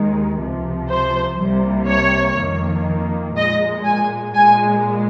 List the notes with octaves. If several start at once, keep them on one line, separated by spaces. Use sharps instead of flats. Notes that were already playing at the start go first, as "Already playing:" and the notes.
Already playing: D#2 D#3 G#3
C#2 C3 F3
C5
C2 C3 G3 A#3
C#5
F2 D#3 A#3
A#2 G#3 D#5
G#5
A#2 G#3 G#5